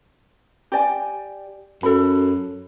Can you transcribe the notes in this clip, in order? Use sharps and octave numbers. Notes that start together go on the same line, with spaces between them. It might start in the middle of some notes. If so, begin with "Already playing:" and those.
G4 D5 G#5
F#2 A4 B5